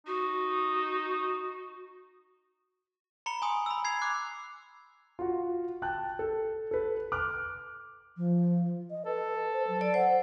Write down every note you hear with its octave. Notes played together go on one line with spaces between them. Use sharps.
D#4 F#4
A#5 B5 C#7 G7
G#5 C6 D#6
B5 E6
G#6 C7 F7
D6 F#6
F4 F#4
G5 A5 F#6
A4
A4 B4
D6 F6 F#6
F3
D#5
A4 B4
C5
F#3
D5
C5 F#5